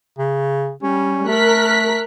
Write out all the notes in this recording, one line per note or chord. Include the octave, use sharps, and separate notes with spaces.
C#3
G3 C#4
A3 A#4 F#6 B6